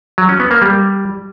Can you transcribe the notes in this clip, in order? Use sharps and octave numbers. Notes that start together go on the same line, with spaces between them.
F#3
C#4
B3
A#3
G3